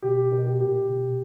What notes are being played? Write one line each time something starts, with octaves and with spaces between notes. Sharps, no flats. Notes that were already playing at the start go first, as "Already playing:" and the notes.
B2 G4
B2 A#4
G4
A#2 G4
B2